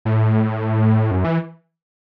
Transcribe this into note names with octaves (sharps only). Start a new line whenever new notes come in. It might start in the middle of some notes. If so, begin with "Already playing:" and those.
A2
F#2
E3